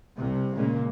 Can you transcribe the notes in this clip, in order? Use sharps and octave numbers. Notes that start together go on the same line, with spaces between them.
C2 C3
A#2 C#3 G#3 A#3